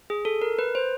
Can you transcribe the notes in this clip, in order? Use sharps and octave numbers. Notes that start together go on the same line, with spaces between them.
G#4
A4
A#4
B4
C5